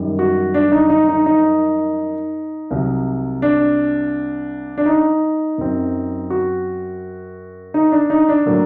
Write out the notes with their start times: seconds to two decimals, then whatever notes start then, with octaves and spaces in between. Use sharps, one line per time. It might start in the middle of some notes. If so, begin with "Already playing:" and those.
Already playing: F#2 D#3 G3
0.19 F#4
0.54 D4
0.72 D#4
0.90 D#4
1.09 D#4
1.26 D#4
2.71 C2 C3 F#3
3.42 D4
4.78 D4
4.86 D#4
5.58 F#2 F#3 C4
6.30 F#4
7.74 D#4
7.92 D4
8.10 D#4
8.29 D4
8.46 A2 F#3 A#3